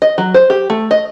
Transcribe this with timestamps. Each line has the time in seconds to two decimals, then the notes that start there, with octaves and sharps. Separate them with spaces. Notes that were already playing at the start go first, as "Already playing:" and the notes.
0.02 D#5
0.18 F#3
0.34 C5
0.50 G4
0.70 A3
0.91 D#5